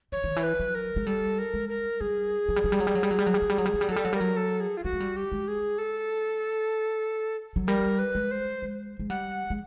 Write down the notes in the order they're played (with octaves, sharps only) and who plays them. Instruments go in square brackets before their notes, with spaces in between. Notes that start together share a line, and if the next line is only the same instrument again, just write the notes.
[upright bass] E3 [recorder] C#5
[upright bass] D#3
E3
[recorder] B4
[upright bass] F#3
[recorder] A#4
[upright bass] G#3
[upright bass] G3 [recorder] A4
[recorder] A#4
[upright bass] G#3
[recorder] A#4
[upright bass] G3 [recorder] G#4
[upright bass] F#3
G3
F#3
G3
F#3
G3
F#3
G3
F#3
G3
F#3
G3
F#3
G3
F#3
G3
F#3
G3
[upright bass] F#3 [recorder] A4
[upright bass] G3
F#3
[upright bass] G3 [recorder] A#4
[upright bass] F#3
[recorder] A4
G#4
F4
[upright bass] G3 [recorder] F#4
[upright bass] G#3
G3
[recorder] G4
[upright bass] G#3
[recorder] G#4
A4
[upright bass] F#3
[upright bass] G3 [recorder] A#4
[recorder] B4
[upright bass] G#3
[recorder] C5
[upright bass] G#3
G#3
[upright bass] G3 [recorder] F#5
[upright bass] G#3